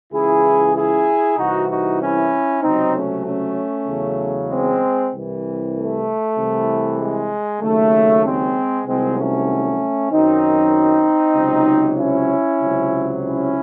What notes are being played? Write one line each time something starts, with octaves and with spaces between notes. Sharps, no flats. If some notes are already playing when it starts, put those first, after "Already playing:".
C#2 C#3 E3 E4 G#4
E4 G#4
C2 C3 E3 D#4 F#4
D#4 F#4
C#4 E4
C#2 C3 F#3 C4 D#4
A3 C#4
A3 C#4
E2 C#3 F#3
G#3 C4
C2 C3 E3
A3
C2 C3 E3
G#3
D#2 C#3 F#3 A3
G#3 C4
C2 C3 D#3 F#3 G#3 C4
A3 C#4
F#2 D#3 F#3 C4 D#4
C#2 C3 F#3
C#4 E4
C#2 C3 F#3
C#4 E4